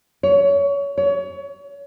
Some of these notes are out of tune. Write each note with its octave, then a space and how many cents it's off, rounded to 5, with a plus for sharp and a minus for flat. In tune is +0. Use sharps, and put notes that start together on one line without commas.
C#5 +25
C#5 +30